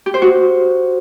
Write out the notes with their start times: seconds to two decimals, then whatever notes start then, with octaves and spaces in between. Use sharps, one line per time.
0.06 G4
0.14 C5
0.22 F#4